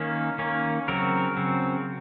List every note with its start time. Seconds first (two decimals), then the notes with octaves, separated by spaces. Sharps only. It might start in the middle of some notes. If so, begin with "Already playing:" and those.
Already playing: D#3 A#3 C#4
0.38 D#3 A#3 C#4
0.88 C#3 F#3 C4 F#4 A#4
1.36 C#3 F#3 C4